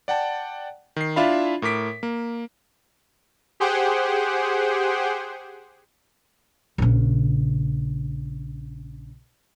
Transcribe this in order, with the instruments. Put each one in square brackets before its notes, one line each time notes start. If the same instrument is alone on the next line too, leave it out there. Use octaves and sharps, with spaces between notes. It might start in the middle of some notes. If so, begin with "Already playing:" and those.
[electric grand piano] D5 F#5 G5 A5
D#3 C7
D4 E4 F4 E5 F5 B5
A2 A#4 D6 B6 D7
A#3
[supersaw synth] G4 G#4 C5 F#5 G5
[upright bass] A#1 C#3